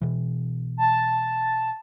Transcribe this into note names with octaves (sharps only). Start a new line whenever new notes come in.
B2 E3
A5